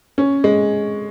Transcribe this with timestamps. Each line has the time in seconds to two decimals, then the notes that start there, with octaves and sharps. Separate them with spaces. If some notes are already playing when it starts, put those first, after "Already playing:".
0.18 C#4
0.44 G#3